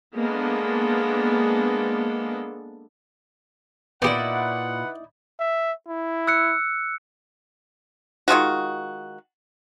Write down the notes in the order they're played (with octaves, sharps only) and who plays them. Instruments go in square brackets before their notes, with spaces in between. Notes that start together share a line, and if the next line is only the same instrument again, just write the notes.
[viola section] G#3 A#3 B3 D4 A4
[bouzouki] A#2 [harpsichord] B3 G4 [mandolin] D#4 E4 D5 [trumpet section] B4 F#5
[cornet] E5
E4
[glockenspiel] E6 F#6 C#7
[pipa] D#3 G#3 F4 F#4